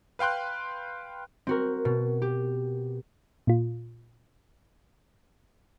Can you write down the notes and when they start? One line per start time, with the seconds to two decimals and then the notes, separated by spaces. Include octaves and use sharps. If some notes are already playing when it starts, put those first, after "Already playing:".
0.19 B4 F5 G5 C6 F#6
1.47 C4 F#4 A#4
1.85 B2
2.22 G4
3.47 A#2 F4